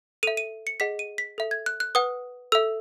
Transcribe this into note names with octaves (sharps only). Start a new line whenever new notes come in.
A4 E5 D#7
D#7
C#7
G#4 D#5 F#5 B6
D#7
B6
A4 E5
G#6
F#6
F#6
B4 F#5 D#6
A4 E5 E6